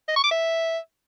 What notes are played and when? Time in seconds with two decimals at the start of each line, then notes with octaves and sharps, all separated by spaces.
0.09 D#5
0.16 C#6
0.24 D6
0.31 E5